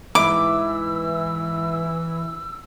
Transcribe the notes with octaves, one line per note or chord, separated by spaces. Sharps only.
G#2 E3 E5 B5 D6 E6